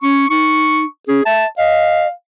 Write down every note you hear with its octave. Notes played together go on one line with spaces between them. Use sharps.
C#4 C#6
D#4 C#6
C#4 G#4
E5 A5
D#5 F5